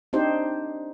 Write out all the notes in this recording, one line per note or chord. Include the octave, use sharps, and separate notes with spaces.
C4 D4 D#4 G4 C5